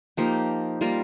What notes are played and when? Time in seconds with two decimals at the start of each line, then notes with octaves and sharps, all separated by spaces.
0.17 F3 A#3 D#4 G4
0.81 G3 A#3 F4 A#4